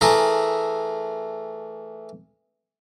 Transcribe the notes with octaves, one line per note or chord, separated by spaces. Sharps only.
E3 A3 G#4 A#4